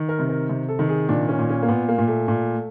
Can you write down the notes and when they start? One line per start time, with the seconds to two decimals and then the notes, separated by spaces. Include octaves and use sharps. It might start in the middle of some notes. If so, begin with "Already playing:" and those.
Already playing: D#3
0.09 A#4
0.19 C3
0.29 A#4
0.49 C3
0.68 A4
0.79 D#3
0.89 G#4
1.09 A#2 D4
1.29 C#4
1.39 A#2
1.49 C#4
1.62 A#3
1.68 A#2 B3
1.88 A#3
1.98 A#2
2.08 A3
2.28 A#2